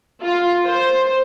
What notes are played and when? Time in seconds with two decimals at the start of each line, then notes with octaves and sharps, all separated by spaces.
0.22 F4
0.66 C5